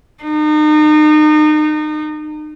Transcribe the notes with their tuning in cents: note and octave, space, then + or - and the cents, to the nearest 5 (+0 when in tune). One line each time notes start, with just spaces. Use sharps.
D#4 -35